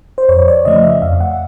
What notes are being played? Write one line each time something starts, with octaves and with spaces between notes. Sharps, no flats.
C5
F2 C#5
D5
C#3 F3 A3 D#5
E5
F2 F5
F#5